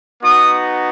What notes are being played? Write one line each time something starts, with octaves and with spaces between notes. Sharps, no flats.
B3 D#4 F#4 D#6